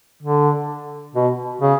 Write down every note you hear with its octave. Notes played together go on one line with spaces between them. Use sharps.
D3
B2
C#3